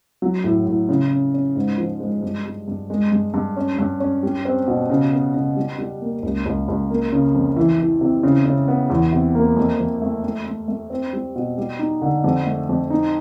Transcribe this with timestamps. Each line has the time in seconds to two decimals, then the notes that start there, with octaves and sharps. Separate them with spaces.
0.22 F#3
0.44 A2
0.66 A2
0.89 C#3
1.11 C#4
1.34 C#4
1.56 G#2
1.78 F3
2.00 G#3
2.22 G2
2.45 G3
2.68 G2
2.90 G#3
3.12 G2
3.34 G2
3.56 C#4
3.78 G2
4.00 C#4
4.23 G3
4.45 C4
4.67 B2
4.90 C#3
5.12 B3
5.34 C#3
5.56 G3
5.78 G3
6.01 A#3
6.23 C#2
6.46 C#2
6.68 C#2
6.90 A#3
7.12 C#3
7.34 F2
7.57 E3
7.79 E3
8.01 C3
8.23 C#3
8.46 C#3
8.68 B3
8.90 E2
9.13 C3
9.35 A#3
9.57 F2
9.79 F2
10.02 A3
10.24 A3
10.46 A3
10.68 A3
10.90 C4
11.13 G3
11.36 B2
11.58 G3
11.79 D#4
12.02 D3
12.24 F2
12.46 A3
12.69 F2
12.90 D#4